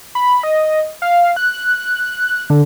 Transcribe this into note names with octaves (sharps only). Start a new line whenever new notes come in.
B5
D#5
F5
F#6
D3